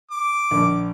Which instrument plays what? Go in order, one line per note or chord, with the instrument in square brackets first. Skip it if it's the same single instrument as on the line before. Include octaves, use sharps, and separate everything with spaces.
[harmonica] D6
[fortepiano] A#1